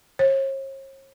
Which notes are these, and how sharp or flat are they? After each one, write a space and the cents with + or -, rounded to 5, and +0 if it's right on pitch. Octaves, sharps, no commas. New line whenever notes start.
C#5 -45